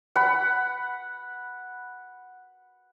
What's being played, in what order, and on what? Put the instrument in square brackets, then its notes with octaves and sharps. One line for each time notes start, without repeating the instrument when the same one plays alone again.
[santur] F#5 B5